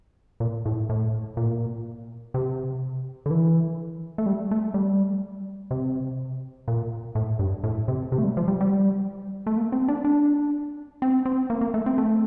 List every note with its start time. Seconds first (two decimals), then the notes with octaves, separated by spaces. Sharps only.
0.40 A#2
0.66 A2
0.89 A2
1.37 A#2
2.34 C3
3.26 D3
3.31 E3
4.18 A3
4.26 G3
4.51 A3
4.74 G3
5.71 C3
6.68 A#2
7.15 A2
7.39 G2
7.64 A2
7.88 C3
8.12 C3
8.18 A3
8.24 G3
8.37 F3
8.48 G3
8.61 G3
9.47 A3
9.57 A#3
9.72 C4
9.88 D4
10.05 D4
11.02 C4
11.26 C4
11.50 A#3
11.61 A#3
11.74 A3
11.86 C4
11.98 A3